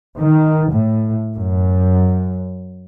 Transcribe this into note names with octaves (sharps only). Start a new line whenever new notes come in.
D#3
A2
F#2